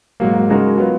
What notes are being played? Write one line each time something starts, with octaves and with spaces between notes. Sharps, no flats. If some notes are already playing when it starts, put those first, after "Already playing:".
G#2 F#3 A#3
C#3 G#3 D#4 F#4 A#4
F#3 B3 F4